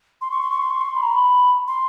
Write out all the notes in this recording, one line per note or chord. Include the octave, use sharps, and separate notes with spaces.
C6
C#6
C6
C#6
C6
C#6
C6
B5
A#5
B5
C6